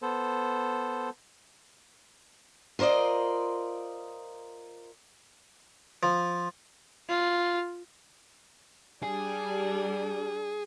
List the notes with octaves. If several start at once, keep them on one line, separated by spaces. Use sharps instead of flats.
B3 A4 C5
F4 A#4 C5 D5 D#5
F3
F4
G3 D4 G#4